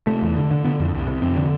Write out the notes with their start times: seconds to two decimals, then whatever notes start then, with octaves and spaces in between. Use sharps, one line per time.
0.07 C3 A3
0.22 E2
0.36 D3
0.51 D3
0.65 D3 B3
0.80 F2
0.94 C2
1.08 C3
1.22 F2 C4
1.36 D3